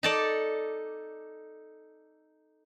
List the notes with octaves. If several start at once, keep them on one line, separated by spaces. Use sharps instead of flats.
D#4 A4 D5